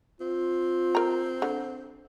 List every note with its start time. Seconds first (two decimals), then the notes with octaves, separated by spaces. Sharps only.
0.20 C4 F4
0.95 A#4 A#5
1.42 D3